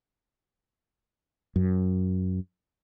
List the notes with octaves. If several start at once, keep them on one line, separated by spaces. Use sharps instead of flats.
F#2